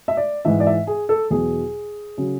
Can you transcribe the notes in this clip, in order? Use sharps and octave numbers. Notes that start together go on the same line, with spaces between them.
E5
D5
G#2 E3 E5
D5
E5
G#4
A4
E2 B2 F#3 G#4
C#3 F#3